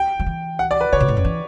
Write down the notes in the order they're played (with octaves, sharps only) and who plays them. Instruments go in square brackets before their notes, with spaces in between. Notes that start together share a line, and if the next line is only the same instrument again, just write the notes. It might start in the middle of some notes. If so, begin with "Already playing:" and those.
Already playing: [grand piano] G5
[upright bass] F#3
E3
[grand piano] F#5
D5
B4
[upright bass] D3 [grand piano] C#5
[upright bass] B2
A2
F#2
E3